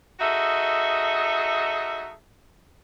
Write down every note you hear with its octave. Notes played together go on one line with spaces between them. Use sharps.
D#4 F#4 G#4 A4 D#5 E5